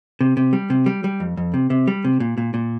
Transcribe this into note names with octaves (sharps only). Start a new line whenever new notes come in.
C3
C3
G3
C3
G3
G3
F2
F2
C3
C3
G3
C3
A#2
A#2
A#2